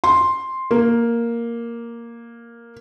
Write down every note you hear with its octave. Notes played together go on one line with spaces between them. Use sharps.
C6
A#3